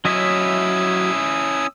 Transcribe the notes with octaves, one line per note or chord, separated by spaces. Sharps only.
F#3 C#4 E4 D#5 E5 D#6 E6